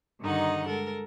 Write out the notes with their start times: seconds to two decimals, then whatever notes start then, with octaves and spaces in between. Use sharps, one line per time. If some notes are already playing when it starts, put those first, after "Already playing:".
0.21 G2 D3 D#3 D#4 D#5 F#5
0.67 G#3 A4 A#4